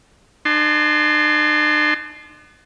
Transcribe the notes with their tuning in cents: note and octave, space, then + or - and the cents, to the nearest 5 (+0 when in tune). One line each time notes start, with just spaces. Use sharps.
D4 +45 A5 -40 C6 +0